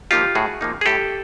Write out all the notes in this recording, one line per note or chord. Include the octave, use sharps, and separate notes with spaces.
F3 A#3 D#4 F4 G4
A2 F#4 G#4
F3 A#3 D#4
G#4
A2 G4 A4